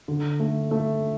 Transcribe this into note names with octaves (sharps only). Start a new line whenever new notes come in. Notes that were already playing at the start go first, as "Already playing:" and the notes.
D3
A3
A3